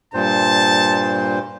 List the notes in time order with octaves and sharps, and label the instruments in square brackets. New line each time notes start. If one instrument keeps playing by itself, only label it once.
[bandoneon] G2 A#2 C5 [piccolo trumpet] A5